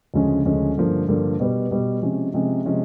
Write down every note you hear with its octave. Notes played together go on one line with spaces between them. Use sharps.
D2 C#3 F3 G#3 C#4
D2 C#3 F3 G#3 C#4
G2 D3 F3 A#3
G2 D3 F3 A#3
B2 G3 B3
B2 G3 B3
C3 F3 G#3 C#4
C3 F3 G#3 C#4
C3 F3 G#3 C#4